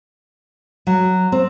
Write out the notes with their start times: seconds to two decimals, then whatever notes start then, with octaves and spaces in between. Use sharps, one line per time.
0.87 F#3
1.32 C4